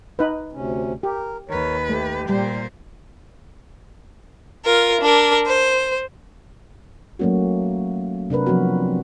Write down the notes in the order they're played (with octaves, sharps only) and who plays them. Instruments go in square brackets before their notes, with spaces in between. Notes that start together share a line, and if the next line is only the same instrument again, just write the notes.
[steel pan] D#4 B4
[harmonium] D2 C3 C#4
[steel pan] G4 [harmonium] A#4
[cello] D#2 B4 [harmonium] A#4 C#5
[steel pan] A3 [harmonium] G4
[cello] A#2 C5 [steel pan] G3
[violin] F4 A#4
D4 A#4
C5
[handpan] F#3 A3 A#3 C#4 F#4
C3 D4 A#4 B4
F3 F#3 B3 C4 F#4